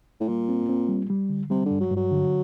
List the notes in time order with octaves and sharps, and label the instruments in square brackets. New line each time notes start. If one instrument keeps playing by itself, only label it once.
[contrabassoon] A2
[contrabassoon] A#2 [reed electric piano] G3
[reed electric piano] C4
C4
G3
G3
D3
[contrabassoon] C3 [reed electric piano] G3
[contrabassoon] D3
[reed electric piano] G2
[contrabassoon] F#3
[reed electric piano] G2 [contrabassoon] F#3
[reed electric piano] D3